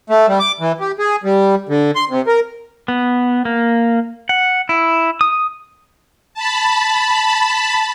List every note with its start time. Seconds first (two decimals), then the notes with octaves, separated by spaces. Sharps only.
0.10 A3
0.28 G3
0.39 D6
0.60 E3
0.80 G4
0.99 G#4
1.24 G3
1.69 D3
1.95 C6
2.09 C3
2.27 A#4
2.88 B3
3.45 A#3
4.29 F#5
4.69 E4
5.21 D#6
6.34 A5 B5